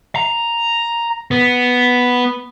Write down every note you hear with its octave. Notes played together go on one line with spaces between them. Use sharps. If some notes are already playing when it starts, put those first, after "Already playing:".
A#5
B3